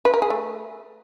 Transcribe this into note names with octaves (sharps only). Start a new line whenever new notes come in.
B4
A#4
G#4
A3